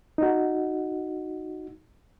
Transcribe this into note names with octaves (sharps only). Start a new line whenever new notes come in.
D#4 F#4